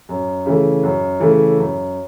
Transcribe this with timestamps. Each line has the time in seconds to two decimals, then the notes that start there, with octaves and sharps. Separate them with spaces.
0.09 F#2
0.46 C#3 E3 A3
0.83 F#2
1.20 C#3 E3 A3
1.58 F#2